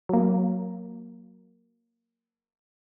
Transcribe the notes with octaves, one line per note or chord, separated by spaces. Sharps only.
F#3 A#3